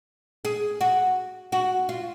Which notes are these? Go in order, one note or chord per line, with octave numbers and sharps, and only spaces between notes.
G#4
F#4
F#4
F4